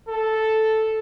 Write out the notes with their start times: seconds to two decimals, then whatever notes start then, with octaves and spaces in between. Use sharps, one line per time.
0.09 A4